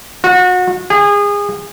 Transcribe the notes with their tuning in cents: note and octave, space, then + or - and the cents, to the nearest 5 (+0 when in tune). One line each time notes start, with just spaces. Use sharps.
F#4 -30
G#4 -30